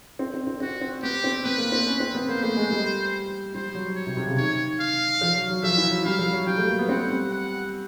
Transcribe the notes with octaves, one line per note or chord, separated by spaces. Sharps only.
C4
C4
C4
C4 F#4
C4
B3 G4
C4
B3 B4
A#3
C4
C#4
C4
B3
A#3 C5
A3
G#3
G3
G3 C5
F#3
C#5
C3
C3
C#3
D#3 C#5
F5
F3
F#3
F#3
F3 E5
E3
F#3
G3 F5
F3
F#3
G3 G5
A3
A#3
B3
C4 F#5
G3
F#5